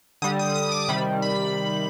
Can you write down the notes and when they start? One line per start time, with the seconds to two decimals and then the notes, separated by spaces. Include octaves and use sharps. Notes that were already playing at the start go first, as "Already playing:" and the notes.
0.22 D3 G3 D#6
0.39 D#6
0.56 D#6
0.72 D6
0.88 C3 D#3 G3 B5
1.22 B5